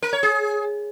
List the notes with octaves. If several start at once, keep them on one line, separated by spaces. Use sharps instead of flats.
A#4
C#5
G#4